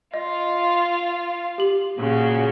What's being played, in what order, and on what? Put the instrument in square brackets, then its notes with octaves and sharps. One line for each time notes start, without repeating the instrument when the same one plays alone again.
[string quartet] F4 F5 [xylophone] D#5
[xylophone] G4 F#7
[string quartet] A#2 C#3 F#4